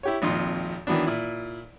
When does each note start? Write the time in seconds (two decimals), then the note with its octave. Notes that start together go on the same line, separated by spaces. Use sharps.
0.03 E4 G4 C#5
0.22 G#1 F2 A#2 D#4 C6
0.87 D#3 E3 F#3 B3 D4
1.06 A#2 E4